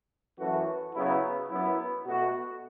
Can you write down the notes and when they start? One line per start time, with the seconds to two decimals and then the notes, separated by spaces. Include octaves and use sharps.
0.39 F#2 E3 A3 F#4 A4
0.94 C#3 F#3 B3 E4 B4
1.49 F#2 F#3 B3 E4
2.04 B2 A3 F#4